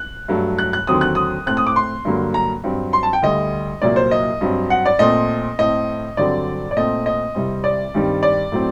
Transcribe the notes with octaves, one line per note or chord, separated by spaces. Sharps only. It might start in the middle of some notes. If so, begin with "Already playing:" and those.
Already playing: F#6
G2 F#3 A3
F#6
F#6
D#2 D3 F#3 C4 D#6
F#6
D#6
A2 A3 C4 F#6
D#6
D6
C6
G2 D3 F#3 A#3
A#5
G2 F#3 C4
C6
A5
G5
D2 D3 G3 D#5
C2 A#2 F#3 A#3 D5
C5
D#5
G2 F#3 C4
F#5
D5
A#2 A3 C4 D#5
A2 A3 C4 D#5
G2 D3 F#3 C4 D5
D5
A#2 A3 C4 D#5
D#5
C2 C3 G3 C4
D5
G2 D#3 G3 C4
D5
A2 F#3 C4